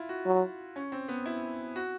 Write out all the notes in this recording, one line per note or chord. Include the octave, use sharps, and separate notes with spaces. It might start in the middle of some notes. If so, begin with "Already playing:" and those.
Already playing: E4 F4
F#4
F#3
C#4
C4
B3
E4
F#4